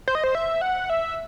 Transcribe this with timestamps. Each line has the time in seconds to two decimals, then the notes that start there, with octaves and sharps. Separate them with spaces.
0.08 C5
0.15 D#5
0.24 C5
0.35 E5
0.61 F#5
0.90 E5